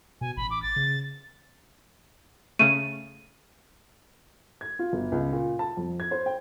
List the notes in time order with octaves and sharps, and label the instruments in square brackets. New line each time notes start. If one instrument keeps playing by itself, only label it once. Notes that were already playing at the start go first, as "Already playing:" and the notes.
[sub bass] B2 [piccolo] G#5
[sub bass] A1 [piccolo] B5
[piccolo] D6
A6
[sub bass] C#3
[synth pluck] C#3 A3 [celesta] D#7
[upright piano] G#6
F4
G1
C#2
A#2
A5
F2
G#6
C5
G5